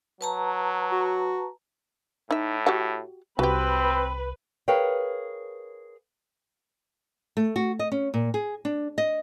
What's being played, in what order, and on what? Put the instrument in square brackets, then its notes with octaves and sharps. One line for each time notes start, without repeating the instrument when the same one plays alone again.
[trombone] F#3 [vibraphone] B4 A5 A#5
[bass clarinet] F#4
[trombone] A2 [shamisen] D#4 E5
[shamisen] F#4 G4 F#5
[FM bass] C2 [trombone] C4 [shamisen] F#4 G4 [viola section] B4
[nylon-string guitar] G#4 A#4 B4 C#5 F5 G5
A3
F#4
D#5
C#4
A#2
G#4
D4
D#5